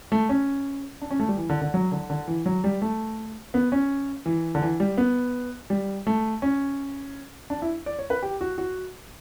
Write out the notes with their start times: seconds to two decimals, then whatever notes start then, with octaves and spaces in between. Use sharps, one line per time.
0.12 A3
0.29 C#4
1.02 D4
1.11 C#4
1.20 A3
1.29 G3
1.38 E3
1.49 D3
1.61 D3
1.74 F#3
1.92 D3
2.10 D3
2.28 E3
2.46 F#3
2.64 G3
2.82 A3
3.54 B3
3.72 C#4
4.26 E3
4.55 D3
4.62 E3
4.80 G3
4.98 B3
5.70 G3
6.07 A3
6.42 C#4
7.50 D4
7.62 E4
7.86 D5
7.99 C#5
8.10 B4
8.22 G4
8.41 F#4
8.58 F#4